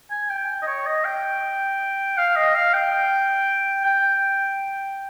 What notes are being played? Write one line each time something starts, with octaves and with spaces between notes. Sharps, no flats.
G#5
G5
D#5
C#5
D#5
G5
F5
D#5
F5
G5
G5